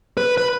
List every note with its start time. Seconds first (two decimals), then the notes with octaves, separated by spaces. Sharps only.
0.17 B4
0.38 B4